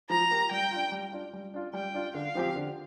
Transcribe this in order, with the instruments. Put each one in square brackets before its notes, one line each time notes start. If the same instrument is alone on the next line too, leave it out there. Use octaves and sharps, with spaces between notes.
[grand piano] F3 [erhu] A#5
[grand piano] A#3 G4
[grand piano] G3 [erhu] G5
[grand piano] D4 F4
G3
D4 F4
G3
D4 F4
[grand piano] G3 [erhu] G5
[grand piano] D4 F4
[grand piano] D3 [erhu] F5
[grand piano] F3 C4 G4
D3